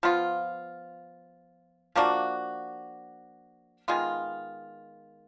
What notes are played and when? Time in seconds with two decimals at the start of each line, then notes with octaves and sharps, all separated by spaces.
0.03 F3 B3 F4
1.95 F3 A#3 D4 F#4
3.88 D#3 G#3 B3 F4